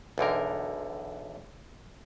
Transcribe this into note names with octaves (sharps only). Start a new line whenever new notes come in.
B1 E2 D3 A#4